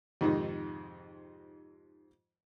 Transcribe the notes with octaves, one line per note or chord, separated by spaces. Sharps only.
F2 G#2 C3 D#3